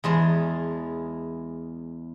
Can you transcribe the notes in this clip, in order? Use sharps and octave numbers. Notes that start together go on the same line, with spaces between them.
E2 G#3 A5 A#5